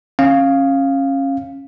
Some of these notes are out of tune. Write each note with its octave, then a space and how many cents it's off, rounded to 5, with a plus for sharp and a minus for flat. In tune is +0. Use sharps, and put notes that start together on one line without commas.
C#4 -25 F5 +0